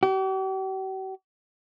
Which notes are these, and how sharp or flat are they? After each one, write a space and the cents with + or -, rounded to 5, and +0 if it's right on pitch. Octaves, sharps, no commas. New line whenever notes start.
G4 -45